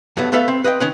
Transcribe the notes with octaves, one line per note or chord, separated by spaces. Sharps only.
G2 F#3 A3 B3
A3 B3 A4 B4 E5 F5
C4
B4 D#5 F5 G5
D#3 C#4 B4